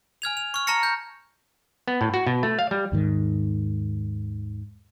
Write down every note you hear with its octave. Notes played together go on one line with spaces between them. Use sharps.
G#5 F6 G#6 F7
F7
C#6 F6
A5 A#5 F6 A#6 C#7
G6
B3
A2
F#4
B2
A3
F5
G3
D#2 G#2 D#3